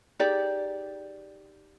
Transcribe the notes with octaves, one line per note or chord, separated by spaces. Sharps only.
D#4 G4 G#4 D5